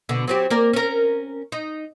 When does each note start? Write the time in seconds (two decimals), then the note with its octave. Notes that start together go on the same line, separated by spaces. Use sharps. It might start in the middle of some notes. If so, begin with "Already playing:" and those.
0.09 B2 D3
0.28 F#3 C4 G4
0.50 A#3 A#4 D5
0.73 C#4 A#4
1.52 D#4